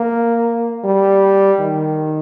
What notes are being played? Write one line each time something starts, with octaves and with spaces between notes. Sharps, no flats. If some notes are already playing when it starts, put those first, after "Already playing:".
Already playing: A#3
G3
D#3